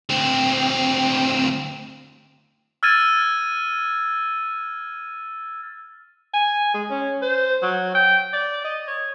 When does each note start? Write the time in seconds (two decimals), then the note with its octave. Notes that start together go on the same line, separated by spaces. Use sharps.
0.09 D2 C4
2.83 E6 F6 G#6 A6 D#7
6.34 G#5
6.74 G#3
6.90 C#4
7.22 C5
7.62 F#3
7.95 G5
8.33 D5
8.64 D#5
8.88 C#5